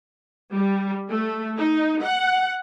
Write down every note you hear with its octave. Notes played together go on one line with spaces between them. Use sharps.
G3
A3
D#4
F#5